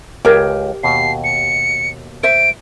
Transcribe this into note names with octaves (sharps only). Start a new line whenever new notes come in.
C#2 G4 G#4 A#4 A5
D#2 B2 C7
C#7
C5 E5 D7